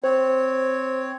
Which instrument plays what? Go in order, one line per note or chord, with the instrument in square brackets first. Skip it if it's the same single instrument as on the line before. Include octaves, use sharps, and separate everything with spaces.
[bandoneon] C4 C#5 [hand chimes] C5